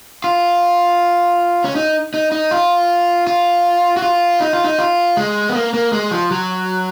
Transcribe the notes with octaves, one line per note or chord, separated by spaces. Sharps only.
F4
C#4
D#4
D#4
D#4
F4
F4
F#4
F4
D#4
F4
D#4
F4
G#3
B3
A#3
A#3
G#3
F3
F#3